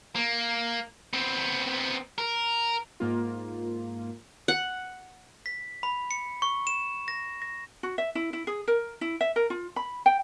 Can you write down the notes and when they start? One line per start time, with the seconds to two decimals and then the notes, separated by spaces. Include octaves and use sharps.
0.16 A#3
1.13 B3 C4
2.18 A#4
3.00 G#2 A#3 F4
4.48 F#5
5.46 B6
5.83 B5
6.11 C#7
6.42 C#6
6.67 E7
7.08 A#6
7.42 A#6
7.83 F#4
7.98 E5
8.15 E4
8.33 E4
8.47 G#4
8.68 A#4
9.01 E4
9.21 E5
9.36 A#4
9.50 F4
9.76 B5
10.06 G5